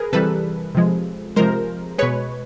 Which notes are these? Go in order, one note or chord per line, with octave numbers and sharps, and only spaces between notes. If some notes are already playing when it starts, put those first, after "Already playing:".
Already playing: G#4 A#4 B4
C3 E3 G3 A4 B4
C3 F3 G#3
C3 F3 G#3 A#4 C5
B2 G#3 B4 C#5